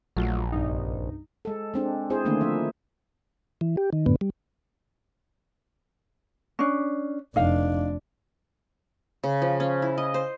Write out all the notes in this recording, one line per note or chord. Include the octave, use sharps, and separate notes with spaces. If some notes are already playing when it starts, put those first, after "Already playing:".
A#1 F#3 A3 F4
C2 G2 D#4
G#3 A4
G#3 C4 D4
C4 E4 G#4 C5
D3 D#3 A3 A#3 D4
F3 E5
E3
G4
D#3
F#2 A2 D3 B3
G3
C#4 D4
F1 D4 D#4 F5
C#3
F3
C#4
E4
D#5
C5